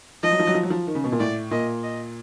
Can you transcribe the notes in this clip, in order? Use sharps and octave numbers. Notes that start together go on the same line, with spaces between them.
F3 D#5
F#3
F3
F#3
F3
F#3
F3
D#3
C#3
B2
A#2
A2 D5
A#2 D#5
D#5